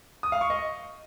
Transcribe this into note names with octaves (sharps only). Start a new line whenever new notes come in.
D#6
F5
C#6
D#5